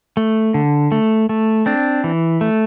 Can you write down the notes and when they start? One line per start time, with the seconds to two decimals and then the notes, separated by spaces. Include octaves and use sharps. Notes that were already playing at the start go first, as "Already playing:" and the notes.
0.17 A3
0.54 D3
0.92 A3
1.29 A3
1.66 C4 D4
2.04 E3
2.41 A3